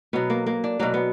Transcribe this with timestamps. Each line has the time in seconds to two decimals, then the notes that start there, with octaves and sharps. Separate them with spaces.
0.13 B2 F#3 B3
0.30 A#3
0.46 A#3
0.64 D4
0.79 B2 F#3 A#3
0.94 B3